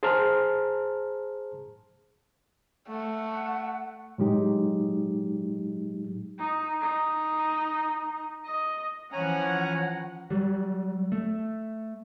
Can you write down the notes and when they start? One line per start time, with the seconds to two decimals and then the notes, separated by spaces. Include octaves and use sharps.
0.03 G#4 C5 A5 A#5 C6 F6
2.88 A3 F#5
4.18 A2 F#3 G#3 D#4 G4
6.39 D#4
6.81 D#4
8.45 D#5
9.13 E3 F3 C#4 F#5 G#5 A#5
10.30 F#3 G3
11.12 A3